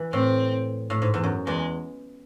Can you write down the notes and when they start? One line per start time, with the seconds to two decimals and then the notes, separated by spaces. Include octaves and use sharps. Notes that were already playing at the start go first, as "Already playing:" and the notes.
Already playing: E3
0.13 A2 C4
0.90 A2
1.02 G#2
1.14 E2
1.23 F#2
1.46 E2 G#3